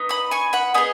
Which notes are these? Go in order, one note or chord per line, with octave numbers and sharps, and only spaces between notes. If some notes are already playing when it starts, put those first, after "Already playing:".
Already playing: B3 D#4
B5 D#6
G#5 C#6
F#5 B5
B3 G#4 D#5 G#5